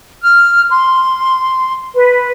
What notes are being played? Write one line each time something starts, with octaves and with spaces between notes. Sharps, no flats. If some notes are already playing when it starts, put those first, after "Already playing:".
F6
C6
B4